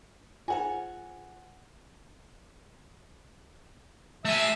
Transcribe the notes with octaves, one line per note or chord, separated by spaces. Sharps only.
F4 G#4 C5 F#5 G#5
A3 E5 G#5 E6